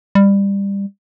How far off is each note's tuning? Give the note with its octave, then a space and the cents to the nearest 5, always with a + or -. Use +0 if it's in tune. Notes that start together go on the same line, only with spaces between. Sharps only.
G3 +20